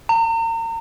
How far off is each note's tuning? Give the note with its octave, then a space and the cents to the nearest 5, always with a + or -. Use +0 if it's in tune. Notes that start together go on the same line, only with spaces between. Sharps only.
A#5 -35